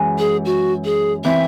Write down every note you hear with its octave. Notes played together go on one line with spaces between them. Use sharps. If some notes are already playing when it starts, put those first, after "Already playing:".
Already playing: F#2 E3 G#3
G#4
F#4
G#4
E3 C4 E5